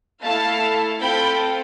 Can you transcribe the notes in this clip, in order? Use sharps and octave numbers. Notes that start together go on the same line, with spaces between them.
A3 E4 A4 F5 A5
C4 F4 A4 G5 B5